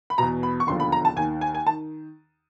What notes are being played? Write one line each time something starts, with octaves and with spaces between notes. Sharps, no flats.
B5
E2 B2 A#5
B5
C#6
E1 D#2 D3 F3 C6
B5
A#5
A5
D#2 D#3 G#5
G#5
G#5
D#3 A5